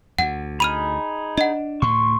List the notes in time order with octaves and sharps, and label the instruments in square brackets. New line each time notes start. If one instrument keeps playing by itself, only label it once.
[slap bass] D2 [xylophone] F#5
[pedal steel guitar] D#4 G#4 B5 [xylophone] F6 D#7 F7
[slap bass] D4 [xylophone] D#5 F#5
[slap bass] D2 A2 [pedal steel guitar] C6 C#6